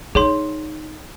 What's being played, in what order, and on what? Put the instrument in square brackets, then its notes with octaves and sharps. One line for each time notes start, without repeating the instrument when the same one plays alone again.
[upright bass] D#4 [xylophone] G#4 C#5 C6